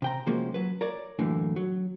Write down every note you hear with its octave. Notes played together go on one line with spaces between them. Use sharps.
C3 G5 A#5
C3 F3 G#3 A#3 C#4 F#4
F#3 B4
A#4 C#5 D5
F#2 A2 D3 E3 A#3
F#3